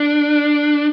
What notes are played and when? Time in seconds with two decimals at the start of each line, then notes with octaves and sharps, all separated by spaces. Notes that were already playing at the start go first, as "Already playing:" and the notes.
Already playing: D4